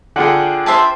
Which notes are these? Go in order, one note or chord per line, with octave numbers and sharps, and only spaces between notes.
D3 F4 G#4 F#5 G5
C5 E5 A5